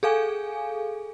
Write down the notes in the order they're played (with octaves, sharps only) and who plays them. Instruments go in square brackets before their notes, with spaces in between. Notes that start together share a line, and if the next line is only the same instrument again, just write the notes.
[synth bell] G#4 A4 F5 G#5